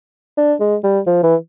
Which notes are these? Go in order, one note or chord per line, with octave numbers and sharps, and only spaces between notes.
D4
G#3
G3
F3
E3